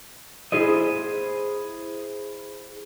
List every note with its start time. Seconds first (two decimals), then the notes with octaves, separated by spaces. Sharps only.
0.52 E4 G#4 C5 D#5